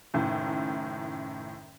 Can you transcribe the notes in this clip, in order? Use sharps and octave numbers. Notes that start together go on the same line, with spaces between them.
F#1 F#2 A2 D#3